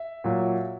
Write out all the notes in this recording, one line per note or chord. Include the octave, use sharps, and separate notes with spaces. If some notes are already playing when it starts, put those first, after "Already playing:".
Already playing: E5
A#2 F#3